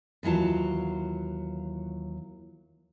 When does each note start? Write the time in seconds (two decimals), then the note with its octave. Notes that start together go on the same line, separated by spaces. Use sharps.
0.23 D#2 E3 F#3 F4 A5